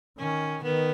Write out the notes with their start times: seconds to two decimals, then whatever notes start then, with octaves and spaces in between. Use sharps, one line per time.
0.18 D#3 C#4
0.63 D#3 B3